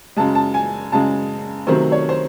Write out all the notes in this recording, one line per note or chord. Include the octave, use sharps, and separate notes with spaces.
F#2 C#3 G#3 A5
A5
G#5
F#2 C#3 G#3 A5
C3 D#3 F#3 A3 C5
C#5
C5